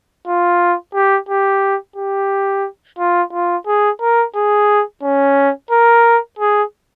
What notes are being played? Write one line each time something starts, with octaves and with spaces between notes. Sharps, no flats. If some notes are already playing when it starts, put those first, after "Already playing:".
F4
G4
G4
G4
F4
F4
G#4
A#4
G#4
C#4
A#4
G#4